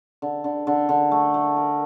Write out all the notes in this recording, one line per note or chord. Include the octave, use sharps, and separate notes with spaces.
D3
D3
D3
D3
A3
A3
A#4